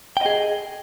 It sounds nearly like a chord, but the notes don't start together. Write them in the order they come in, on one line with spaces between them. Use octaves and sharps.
G5 D#5 G#4